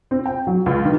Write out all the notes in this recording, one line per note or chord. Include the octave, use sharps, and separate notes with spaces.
C4
G5
F#3
C#2
D#3